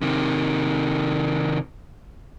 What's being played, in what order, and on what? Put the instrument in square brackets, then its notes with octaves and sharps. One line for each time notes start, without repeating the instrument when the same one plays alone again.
[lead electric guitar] C3 D#3